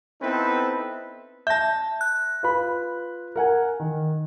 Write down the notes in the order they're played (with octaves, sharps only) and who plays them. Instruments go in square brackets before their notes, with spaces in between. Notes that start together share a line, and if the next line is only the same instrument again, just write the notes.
[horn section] B3 C4 D#4 E4 A4 B4
[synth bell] E5 A5 [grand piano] G6 A#6
[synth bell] F#6
[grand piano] F4 B4 B5
A#4 F#5 G#5
D#3